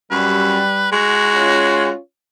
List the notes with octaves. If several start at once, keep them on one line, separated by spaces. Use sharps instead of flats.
F#2 G3 B4
G#3 F#4
C#4 F4 C#5